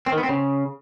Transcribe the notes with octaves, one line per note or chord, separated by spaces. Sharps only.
C4
D#3
B3
C4
C#3